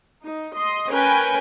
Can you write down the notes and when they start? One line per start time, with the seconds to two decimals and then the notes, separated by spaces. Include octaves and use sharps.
0.23 D#4
0.57 D#5 C6
0.91 C#4 A#4 B4 G5 G#5